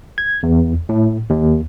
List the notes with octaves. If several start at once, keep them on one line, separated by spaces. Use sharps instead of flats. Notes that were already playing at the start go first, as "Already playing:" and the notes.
G#6
E2
A2
D#2